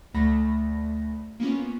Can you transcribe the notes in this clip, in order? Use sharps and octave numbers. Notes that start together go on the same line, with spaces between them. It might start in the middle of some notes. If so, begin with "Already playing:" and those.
D2 A3 B5 A#6
A#3 B3 C#4 F4